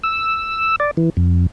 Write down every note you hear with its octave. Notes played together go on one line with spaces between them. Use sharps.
E6
D5
E3
F2